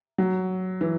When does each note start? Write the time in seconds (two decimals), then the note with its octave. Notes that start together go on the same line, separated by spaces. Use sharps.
0.18 F#3
0.81 E3